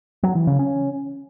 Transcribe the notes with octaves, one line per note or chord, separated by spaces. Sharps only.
F#3
E3
C#3
C#4